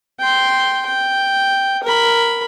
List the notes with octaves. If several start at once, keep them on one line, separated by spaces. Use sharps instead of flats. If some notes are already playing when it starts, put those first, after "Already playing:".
G5 C6
G5
A#4 B5